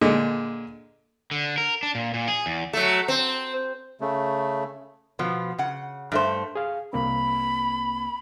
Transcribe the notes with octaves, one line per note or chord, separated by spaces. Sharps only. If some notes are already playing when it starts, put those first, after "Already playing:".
A#2 D3 G#3
D3
A#4
D4
A#2
A#2
G#4
E2
F#3 A3
C4
C#3 A3
B2 F3 B3
C#3 F#5
G2 A3 C5
G#4 F5
C2 A#3 C4 B5